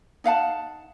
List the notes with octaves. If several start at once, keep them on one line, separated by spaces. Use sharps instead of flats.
D#4 F5 F#5 A5